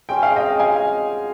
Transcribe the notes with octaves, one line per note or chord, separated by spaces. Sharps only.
G#3 C#4 G#4 G5
F5
D#5 G5
F5 G#5